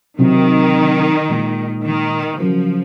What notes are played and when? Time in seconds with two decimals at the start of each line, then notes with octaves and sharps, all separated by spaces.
0.18 C3 D#3 F#3 C4 F#4
1.28 A#2 G#3 D#4
1.84 D#3
2.39 C#3 F3 F#3 C#4 F#4 A#4